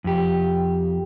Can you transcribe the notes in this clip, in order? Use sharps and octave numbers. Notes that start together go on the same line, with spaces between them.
F2 G4